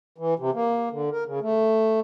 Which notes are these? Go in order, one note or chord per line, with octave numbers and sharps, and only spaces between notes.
E3
C3
A#3
D3
A#4
C#3
A3